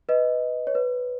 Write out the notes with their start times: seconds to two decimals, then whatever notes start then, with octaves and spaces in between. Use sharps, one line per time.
0.09 B4 D#5
0.67 C#5
0.75 B4